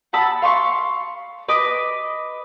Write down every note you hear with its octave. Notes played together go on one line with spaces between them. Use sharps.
F#5 A5 B5 E6
F5 C6 C#6
B4 D#5 D6